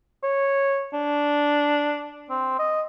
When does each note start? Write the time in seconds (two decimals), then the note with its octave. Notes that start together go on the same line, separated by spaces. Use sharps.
0.23 C#5
0.93 D4
2.30 C4
2.59 D#5